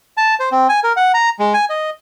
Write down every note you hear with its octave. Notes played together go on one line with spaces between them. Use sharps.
A5
C5
C4
G#5
A#4
F#5
A#5
G#3
G#5
D#5